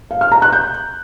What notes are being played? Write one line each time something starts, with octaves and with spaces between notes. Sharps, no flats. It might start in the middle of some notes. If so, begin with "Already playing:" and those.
F5
F6
A#5
F#6
G6